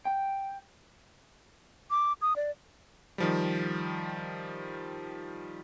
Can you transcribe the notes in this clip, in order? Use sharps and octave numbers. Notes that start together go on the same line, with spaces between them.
G5
D6
D#6
D5
D#3 F3 G3